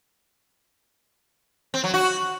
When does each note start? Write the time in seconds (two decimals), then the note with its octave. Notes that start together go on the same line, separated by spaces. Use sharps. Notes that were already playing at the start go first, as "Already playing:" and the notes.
1.74 C4
1.84 F#3
1.94 F#4